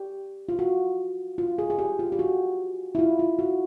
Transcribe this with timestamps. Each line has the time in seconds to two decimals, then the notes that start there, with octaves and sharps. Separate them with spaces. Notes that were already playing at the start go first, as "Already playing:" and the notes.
Already playing: G4
0.49 F4
0.59 F#4
1.38 F4
1.58 G#4
1.70 G#4
1.79 G4
1.99 F4
2.12 G4
2.19 F#4
2.95 E4
2.99 F4
3.19 F4
3.39 F#4